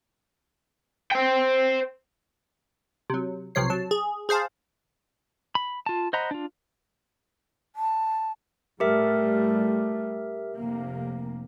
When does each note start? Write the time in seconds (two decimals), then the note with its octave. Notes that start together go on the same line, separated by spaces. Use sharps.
1.12 C5 G5
3.10 C3 F#3
3.55 B1 C3 F3 C#5 C7
3.70 F#3 A5
3.91 G#4
4.29 G#4 C5 F5 A5
5.55 B5
5.86 F4 A5
6.13 C5 D#5 F#5 A#5 B5
6.31 D4 F4
7.76 A5
8.80 A2 G3 A3 G4 A#4 E5
10.58 F1 C3 A#3